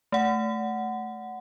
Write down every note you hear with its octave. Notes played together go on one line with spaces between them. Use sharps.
A3 F#5